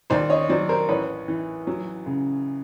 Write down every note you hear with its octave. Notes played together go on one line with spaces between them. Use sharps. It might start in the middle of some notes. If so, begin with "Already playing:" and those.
D#2 C5 D5
C#5 D#5
F#3 C5 D5
A#4 C5
A1 B4 C#5
E3
F#3
C#3